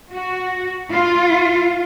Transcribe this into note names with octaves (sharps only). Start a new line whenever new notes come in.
F#4
F4